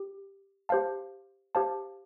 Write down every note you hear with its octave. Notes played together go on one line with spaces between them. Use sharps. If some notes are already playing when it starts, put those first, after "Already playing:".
Already playing: G4
G4 C5 F5 A5
G4 C5 F5 A5